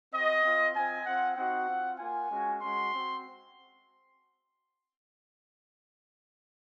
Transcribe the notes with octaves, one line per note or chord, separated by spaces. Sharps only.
C4 F#4 D#5
C4 F4
C4 F4 G#5
C4 F4 F#5
C4 D#4 F#4 F#5
C4 F4
A#3 F4 G#5
G#3 C#4 F#4
G#3 C#4 F#4 C6
C4 F#4